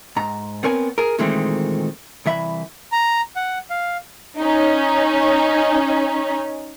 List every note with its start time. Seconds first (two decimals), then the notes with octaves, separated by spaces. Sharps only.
0.16 G#2 A#5
0.63 B3 C4 A#4 C#5 G#5
0.98 G#4 A#4
1.19 A#2 D#3 E3 G#3 A3 C4
2.25 C2 E3 E5 B5
2.92 A#5
3.36 F#5
3.70 F5
4.38 C#4 D#4